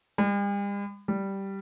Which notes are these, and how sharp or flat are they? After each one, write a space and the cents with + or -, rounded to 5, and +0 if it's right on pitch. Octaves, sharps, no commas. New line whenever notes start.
G3 +45
G3 -5